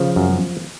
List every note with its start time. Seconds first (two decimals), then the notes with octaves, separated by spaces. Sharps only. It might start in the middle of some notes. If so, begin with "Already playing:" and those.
Already playing: C#3 F3
0.16 F#2